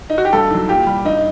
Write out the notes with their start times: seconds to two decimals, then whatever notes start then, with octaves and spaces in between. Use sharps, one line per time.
0.10 D#4
0.18 F#4
0.25 G4
0.33 G2 A4
0.51 D#3 F#3
0.69 A#2 G4
0.87 G3
1.05 G2 D#4